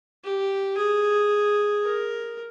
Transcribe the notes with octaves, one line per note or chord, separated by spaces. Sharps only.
G4
G#4
A#4